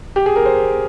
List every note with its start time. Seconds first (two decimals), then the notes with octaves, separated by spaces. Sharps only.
0.16 G4
0.26 G#4
0.36 A#4
0.46 C5